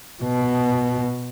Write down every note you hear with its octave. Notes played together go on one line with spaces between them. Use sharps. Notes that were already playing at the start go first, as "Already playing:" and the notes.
B2